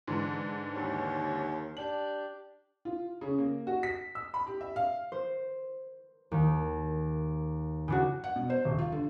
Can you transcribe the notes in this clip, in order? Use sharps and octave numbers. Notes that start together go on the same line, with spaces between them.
G#2 D3 E3
D#2 C#5
D4 G4 D5 F#7
F4
C#3
A#3
F#4
B6
E6
B5
G4
E5
F5
C5
D#2
C#3 D4 F#4
F#5
B2
C5
D#1
F4
D3